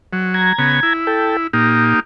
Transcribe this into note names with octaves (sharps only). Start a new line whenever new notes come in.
F#3
A#5 G#6
C#3 B3
E4
A4 G5 A5
A#2 A#3 D#4 G4